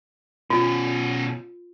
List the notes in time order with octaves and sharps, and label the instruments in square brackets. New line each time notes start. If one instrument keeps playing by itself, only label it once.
[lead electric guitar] B2 C#4 [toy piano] F4